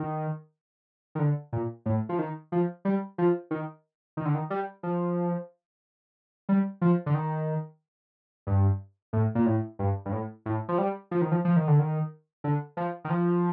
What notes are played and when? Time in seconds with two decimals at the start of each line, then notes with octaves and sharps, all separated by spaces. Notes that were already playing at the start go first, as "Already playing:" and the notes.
Already playing: D#3
1.15 D#3
1.19 D3
1.53 A#2
1.86 A2
2.09 F3
2.19 D#3
2.52 F3
2.85 G3
3.18 F3
3.51 D#3
4.17 D#3
4.25 D3
4.35 D#3
4.50 G3
4.83 F3
6.49 G3
6.81 F3
7.06 D3
7.14 D#3
8.47 G2
9.13 A2
9.35 A#2
9.46 A2
9.79 G2
10.06 G2
10.12 A2
10.46 A2
10.68 F3
10.78 G3
11.11 F3
11.22 D#3
11.32 F3
11.45 F3
11.56 D#3
11.68 D3
11.79 D#3
12.44 D3
12.77 F3
13.04 D#3
13.10 F3